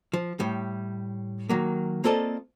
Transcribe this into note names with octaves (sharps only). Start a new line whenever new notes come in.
F3
A2 G3
D#3 F#3 A#3
A#3 C4 F4 A4 D5 D#5